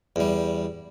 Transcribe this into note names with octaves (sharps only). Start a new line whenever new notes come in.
E2 G3